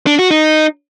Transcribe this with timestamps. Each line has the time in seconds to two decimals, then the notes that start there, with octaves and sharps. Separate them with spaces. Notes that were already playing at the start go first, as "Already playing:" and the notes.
0.07 D4
0.19 F#4
0.31 D#4